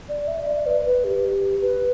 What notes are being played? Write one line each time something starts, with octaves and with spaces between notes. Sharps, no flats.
D5
E5
E5
D5
B4
B4
G4
B4